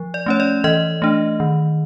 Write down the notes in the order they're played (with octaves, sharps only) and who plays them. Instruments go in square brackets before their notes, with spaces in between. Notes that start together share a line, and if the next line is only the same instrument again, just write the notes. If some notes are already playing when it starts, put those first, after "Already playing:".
Already playing: [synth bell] F3
D5
A3 C#4 C#5
D5
E3 D#5
A3 D4
D#3